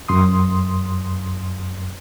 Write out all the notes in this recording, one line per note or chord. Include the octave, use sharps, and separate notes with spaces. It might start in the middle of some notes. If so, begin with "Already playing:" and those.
F#2 C6 D#6